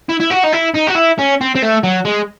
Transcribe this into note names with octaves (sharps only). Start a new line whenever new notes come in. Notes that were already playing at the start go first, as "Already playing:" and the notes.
E4
E4
F#4
D#4
E4
D#4
F#4
E4
C#4
C4
C4
A3
F#3
G#3